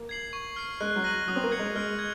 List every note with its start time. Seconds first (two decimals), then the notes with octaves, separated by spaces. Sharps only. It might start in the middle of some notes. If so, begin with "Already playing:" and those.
Already playing: A#3
0.09 G#6 C7 F#7
0.33 C#6
0.56 F6 C7
0.81 G#3 F#6
0.96 F#3
1.04 A#6 D#7 F#7
1.28 F#3 D#6
1.36 C4
1.44 A#3
1.52 G#6 C#7 F#7
1.59 G#3
1.75 G#3 F6
1.99 G#6